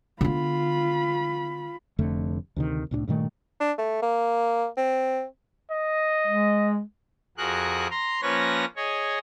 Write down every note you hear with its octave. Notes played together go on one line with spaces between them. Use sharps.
D3 B3 F4 B5
F1 F2 D3 A3
D2 C3 D#3
C2 A2 C#4 D4
G2 A#2 D#3 A3
D4
A3
A#3
C4
D#5
G#3
F2 F#4 G#4 A#4 F#6
A#5 C6
F3 A#3 C#4 B4 C#5 A#6
G#4 C#5 D#5